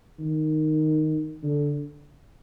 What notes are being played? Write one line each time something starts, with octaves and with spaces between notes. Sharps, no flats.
D#3
D3